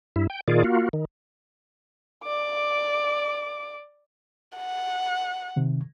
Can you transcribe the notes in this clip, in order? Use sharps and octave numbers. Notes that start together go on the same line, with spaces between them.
G2 E4
G5
A#2 D#3 F4 G#4 D5
A#3 F4 F#4
D#3
D5 D6
F#5
C3 D#3